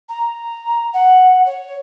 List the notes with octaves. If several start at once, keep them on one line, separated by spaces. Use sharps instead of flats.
A#5
F#5
C#5